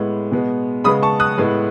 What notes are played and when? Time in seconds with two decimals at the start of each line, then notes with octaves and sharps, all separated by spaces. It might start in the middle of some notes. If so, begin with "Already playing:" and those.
Already playing: A2 G#3 B3
0.32 B2 G#3 B3
0.84 C#3 G#3 B3 B5 D#6
1.03 A5 C#6
1.20 D#6 F#6
1.38 A2 G#3 B3